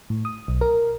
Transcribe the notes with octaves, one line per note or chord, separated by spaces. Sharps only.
A2
D#6
B1
A#4